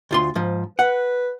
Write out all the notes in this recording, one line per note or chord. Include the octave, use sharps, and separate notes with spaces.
D2 F4 C6
G#2 F3
B4 F#5